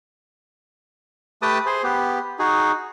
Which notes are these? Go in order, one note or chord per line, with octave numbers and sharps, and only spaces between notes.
A3 G4 B4 G5 A5 D#6
G#4 C5
B3 G4
D#4 F#4 G#4